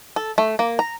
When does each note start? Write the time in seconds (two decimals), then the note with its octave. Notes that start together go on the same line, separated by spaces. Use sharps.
0.16 A4
0.38 A3
0.59 A#3
0.79 A#5